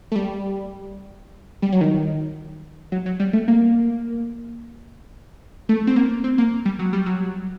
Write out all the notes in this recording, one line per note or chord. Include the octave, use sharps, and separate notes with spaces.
A3
G3
G3
F#3
D#3
F#3
F#3
G3
A3
A#3
A3
C4
A#3
C4
A#3
G3
F#3
G3
F#3